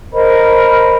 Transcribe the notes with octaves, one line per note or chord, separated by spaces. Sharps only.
A#4 C5 D#5 B5